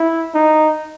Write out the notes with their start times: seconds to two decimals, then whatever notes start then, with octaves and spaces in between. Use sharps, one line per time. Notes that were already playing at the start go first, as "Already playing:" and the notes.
Already playing: E4
0.34 D#4